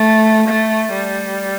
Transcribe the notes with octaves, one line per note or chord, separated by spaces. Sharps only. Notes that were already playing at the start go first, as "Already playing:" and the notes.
Already playing: A3
A3
G3